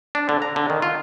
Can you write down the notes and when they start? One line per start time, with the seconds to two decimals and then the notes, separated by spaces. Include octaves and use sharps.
0.15 D4
0.29 D3
0.42 A#5
0.56 D3
0.70 D#3
0.82 F4